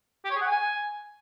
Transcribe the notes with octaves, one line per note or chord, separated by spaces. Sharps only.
G4
C#5
G#4
F#5
G#5